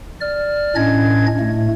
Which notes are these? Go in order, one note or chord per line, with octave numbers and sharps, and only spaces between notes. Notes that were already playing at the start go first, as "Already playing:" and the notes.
D5 F6
A2 C#4 D4 D#5 G#6
A2 A3